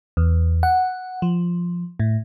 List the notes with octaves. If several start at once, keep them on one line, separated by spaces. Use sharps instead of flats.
E2
F#5
F3
A2